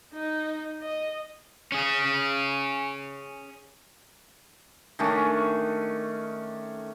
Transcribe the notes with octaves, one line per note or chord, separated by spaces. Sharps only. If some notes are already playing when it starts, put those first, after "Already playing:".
D#4
D#5
C#4 G#4
D#3 A3 C#4 D4